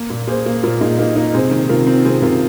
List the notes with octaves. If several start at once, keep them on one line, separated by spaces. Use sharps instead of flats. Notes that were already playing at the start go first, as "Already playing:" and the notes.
Already playing: A#3
A#2
A#3 G#4 C5
A#3
A#2 F4 A#4
A#2 D#4 G#4
A#3 D#4
A#3 D#4
C3 G#4 C5
D#3
C3 F4 A#4
C4
C3 G#4 C5
C3 F4 A#4